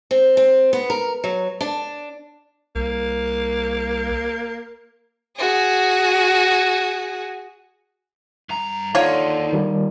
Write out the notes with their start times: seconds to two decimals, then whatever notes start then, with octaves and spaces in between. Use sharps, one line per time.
0.11 C4
0.37 C4
0.73 B3
0.90 A#4
1.24 F#3
1.61 D4
2.75 C2 A#3
5.37 F#4 G#4
8.49 G2 A#5
8.95 D#2 D3 D#4 F4 C#5
9.53 D#3 G3